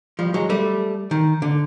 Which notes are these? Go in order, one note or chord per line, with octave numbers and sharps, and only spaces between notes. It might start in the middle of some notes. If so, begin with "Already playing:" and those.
F3 G3
F#3 G#3
G3 A3
D#3
D3